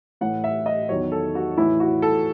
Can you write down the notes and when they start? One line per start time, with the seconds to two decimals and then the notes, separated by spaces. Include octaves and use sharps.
0.21 A2 E3 F#5
0.44 E5
0.66 D#5
0.89 E2 D#3 F#3 C#5
1.12 A4
1.35 F#4
1.57 A2 E3 E4
1.80 F#4
2.02 A4